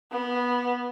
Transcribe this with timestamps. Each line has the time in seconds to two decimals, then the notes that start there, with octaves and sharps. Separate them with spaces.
0.12 B3